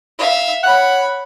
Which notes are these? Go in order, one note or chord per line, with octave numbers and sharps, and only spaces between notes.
E5 F5
C#5 F#5 B5